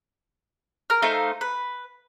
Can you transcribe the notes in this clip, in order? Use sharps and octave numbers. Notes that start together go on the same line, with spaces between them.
A#4 F6
A3 D#4 C5 F5
B4